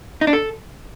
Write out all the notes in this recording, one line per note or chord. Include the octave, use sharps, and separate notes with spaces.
D#4
D4
A4